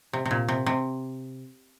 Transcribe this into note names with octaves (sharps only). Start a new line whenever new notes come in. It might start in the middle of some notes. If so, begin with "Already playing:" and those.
C3
C3
A#2
C3
C3